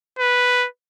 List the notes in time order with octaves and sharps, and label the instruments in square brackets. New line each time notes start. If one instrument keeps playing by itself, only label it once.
[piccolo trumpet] B4